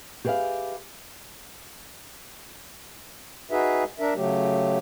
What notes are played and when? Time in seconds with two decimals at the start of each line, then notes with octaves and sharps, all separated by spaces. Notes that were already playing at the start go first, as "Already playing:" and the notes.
0.25 G4 G#4 B4 D5 E5 F5
3.51 D#4 F#4 G#4 B4 E5
4.00 D4 A#4 E5
4.15 C#3 F#3 A3 G4